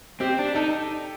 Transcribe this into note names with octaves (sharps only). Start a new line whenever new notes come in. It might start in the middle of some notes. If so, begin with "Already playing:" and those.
C4 G4
D4
D#4 A4